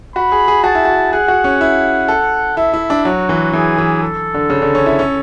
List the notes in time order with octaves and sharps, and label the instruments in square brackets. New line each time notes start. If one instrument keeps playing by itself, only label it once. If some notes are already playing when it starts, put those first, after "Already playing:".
[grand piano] F#4 [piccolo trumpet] B5
[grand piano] G#4
G#4
[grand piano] F#4 [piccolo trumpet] A5
[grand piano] E4
F#4
[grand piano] G#4 [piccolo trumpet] F#5
[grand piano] F#4
C#4
E4
A4
[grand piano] E4 [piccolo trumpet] E5
[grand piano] E4
D4
[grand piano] F#3 [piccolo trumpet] F#4
[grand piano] E3
[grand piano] E3 [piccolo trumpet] G#4
[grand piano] E3
[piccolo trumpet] A4
[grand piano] D3
C#3
D3
C#4
E4
C#4